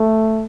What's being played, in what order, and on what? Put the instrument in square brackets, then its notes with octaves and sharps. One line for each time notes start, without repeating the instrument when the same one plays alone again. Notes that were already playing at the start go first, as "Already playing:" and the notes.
Already playing: [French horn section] A3